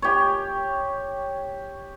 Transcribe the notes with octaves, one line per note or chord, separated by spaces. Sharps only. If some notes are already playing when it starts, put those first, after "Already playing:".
G4 C#5